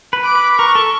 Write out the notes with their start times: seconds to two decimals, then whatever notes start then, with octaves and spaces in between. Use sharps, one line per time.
0.13 B4
0.24 D6
0.35 B4
0.59 A#4 C#6
0.75 A4